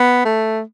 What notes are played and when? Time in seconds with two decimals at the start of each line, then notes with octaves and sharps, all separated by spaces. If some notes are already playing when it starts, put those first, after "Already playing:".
Already playing: B3
0.25 A3